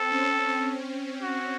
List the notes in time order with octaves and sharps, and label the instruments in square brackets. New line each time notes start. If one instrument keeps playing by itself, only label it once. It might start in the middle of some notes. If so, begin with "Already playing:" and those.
Already playing: [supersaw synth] C4 [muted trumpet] A4
[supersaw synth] C#4
C4
[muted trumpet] F#4